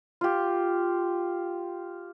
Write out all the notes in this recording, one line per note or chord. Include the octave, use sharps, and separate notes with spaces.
F4 G4